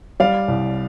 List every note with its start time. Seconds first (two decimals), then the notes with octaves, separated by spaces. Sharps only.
0.20 G3 D5 F5
0.48 C2